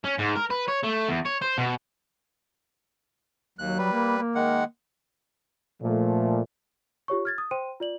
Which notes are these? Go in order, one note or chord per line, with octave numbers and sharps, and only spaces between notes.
C#4
G#2
A#4
B4
C#5
A3
E2
C#5
C5
B2
D#2 F#3 F#6
G3 B4
A#3
A#3
D#3 G#3 F#5
A#2 F3 A3
F4 G4 C#5 C#6
F6 G#6 A6
D#6
C5 G5 C6 D#7
F4 D5 F#7